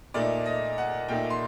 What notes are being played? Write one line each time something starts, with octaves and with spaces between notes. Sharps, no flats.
A#2 A3 D#4 D5
D#5
F#5
A#2 A3 D#4 G5
C6